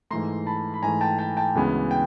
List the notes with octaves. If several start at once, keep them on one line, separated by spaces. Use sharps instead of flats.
G#2 E3 A3 A#5 C6
A5 B5
B5
G#2 E3 A3 G#5 A#5
G5 A5
G5 A5
G5 A5
D2 C#3 E3 G#3 B3
G5